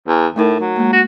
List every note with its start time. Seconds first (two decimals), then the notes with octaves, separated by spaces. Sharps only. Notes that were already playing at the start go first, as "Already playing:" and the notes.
0.08 E2
0.36 A2 A3 D#4 A#4
0.60 F#3
0.76 G#3 A#3
0.93 F#4